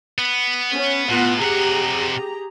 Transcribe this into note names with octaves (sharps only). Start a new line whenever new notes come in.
B3
C#4
A2 B3 F4 F#5
C3 G4 G#4 F#5 A#5